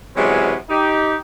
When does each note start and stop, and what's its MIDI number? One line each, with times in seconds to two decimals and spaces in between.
0.16 0.54 48
0.16 0.54 52
0.16 0.54 54
0.16 0.54 56
0.16 0.54 59
0.16 0.54 61
0.69 1.15 63
0.69 1.15 67